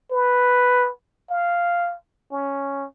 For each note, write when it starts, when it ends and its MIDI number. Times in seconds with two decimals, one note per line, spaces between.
0.12 0.90 71
1.30 1.95 77
2.32 2.86 61